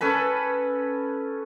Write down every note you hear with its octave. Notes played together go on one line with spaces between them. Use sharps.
C#4 A4 B4 B5